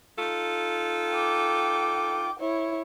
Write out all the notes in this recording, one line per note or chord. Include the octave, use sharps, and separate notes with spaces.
D#4 F4 A4
G5 D6
E4 C#5